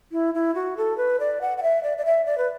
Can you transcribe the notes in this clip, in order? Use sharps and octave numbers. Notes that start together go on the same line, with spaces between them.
E4
E4
F#4
A4
B4
D5
F#5
F#5
E5
D5
D5
E5
D5
B4